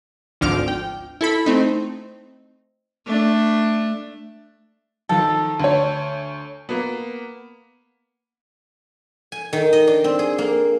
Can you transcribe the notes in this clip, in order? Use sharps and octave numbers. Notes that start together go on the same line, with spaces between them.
G#1 D2 D3 F3 D6 F6
G5
E4 A4 B5
A3 C4 D#4
A3 D4
D#3 F3 A4
D2 C#5
A#3 B3
G#5
D#3
D#5
D4
C4
G#4
A#3